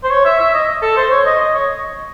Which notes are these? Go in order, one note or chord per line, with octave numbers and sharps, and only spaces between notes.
C5
C#5
E5
E5
D#5
A4
C5
C#5
D#5
D#5
C#5